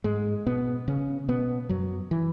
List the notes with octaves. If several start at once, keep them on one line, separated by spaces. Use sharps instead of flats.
G#2 G#3
B2 B3
C#3 C#4
B2 B3
F#2 F#3
E3